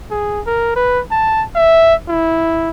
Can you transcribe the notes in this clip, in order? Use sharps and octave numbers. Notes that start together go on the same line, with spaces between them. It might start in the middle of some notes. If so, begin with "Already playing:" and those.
G#4
A#4
B4
A5
E5
E4